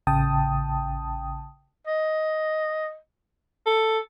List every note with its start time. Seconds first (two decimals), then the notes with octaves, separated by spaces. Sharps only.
0.07 A1 C#3 G5 A5 D#6
1.87 D#5
3.66 A4